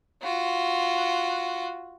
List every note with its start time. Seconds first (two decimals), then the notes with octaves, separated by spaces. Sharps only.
0.22 F4 F#4